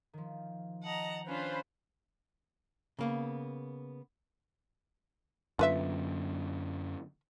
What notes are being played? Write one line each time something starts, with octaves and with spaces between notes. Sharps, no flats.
D#3 F3
D#5 F#5 A5 A#5
C#4 D4 F4 B4 C5 B5
C#3 A#3 B3
F#2 D3 F4 B4 E5